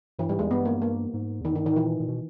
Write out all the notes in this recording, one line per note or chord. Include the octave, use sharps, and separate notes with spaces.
G2 E3
G#2 G3
E2 G#3
G2 B3
A#3
A#3
G#2
E2 D#3
G2 D#3
G#2 D#3
A#2 E3
A#2
B2